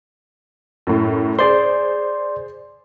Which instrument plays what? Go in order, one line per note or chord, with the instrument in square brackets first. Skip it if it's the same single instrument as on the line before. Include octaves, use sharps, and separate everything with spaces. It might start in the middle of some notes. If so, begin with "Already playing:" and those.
[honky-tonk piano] F#2 A2
[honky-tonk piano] G#4 C5 [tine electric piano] D5 C6